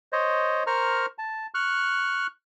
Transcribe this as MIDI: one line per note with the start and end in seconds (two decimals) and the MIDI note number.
0.12 0.63 72
0.12 0.63 73
0.12 0.63 75
0.67 1.06 70
0.67 1.06 72
0.67 1.06 82
0.67 1.06 85
0.67 1.06 89
1.18 1.46 81
1.54 2.27 85
1.54 2.27 89
1.54 2.27 90